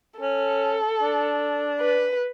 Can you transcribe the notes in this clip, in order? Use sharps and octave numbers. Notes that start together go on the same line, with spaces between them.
C#4 A4
D4
B4